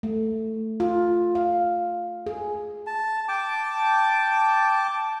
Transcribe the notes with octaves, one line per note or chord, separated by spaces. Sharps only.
A3
F4
F5
G#4
A5
G5 A5 D6